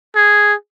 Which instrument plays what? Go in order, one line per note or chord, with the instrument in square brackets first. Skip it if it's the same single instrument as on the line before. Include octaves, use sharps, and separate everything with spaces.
[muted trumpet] G#4